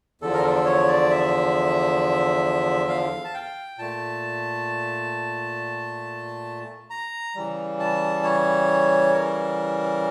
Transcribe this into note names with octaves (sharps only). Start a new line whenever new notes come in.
E2 D3 F3 A4
A#4
A4
C#5
D5
E5
F5
A5
G5
A#2 A3 A5
A#5
C#3 E3 G3
A5
C#5
A#4